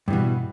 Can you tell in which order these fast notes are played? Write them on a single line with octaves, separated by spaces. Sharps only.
G2 E3 B2